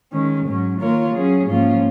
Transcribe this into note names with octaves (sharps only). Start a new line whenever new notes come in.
D#3 G#3 C#4
G#2 F#3 C#4
D#3 A#3 F4 A#4 C#5
F#3 C#4 G#4
G#2 F3 A#3 C#4 F4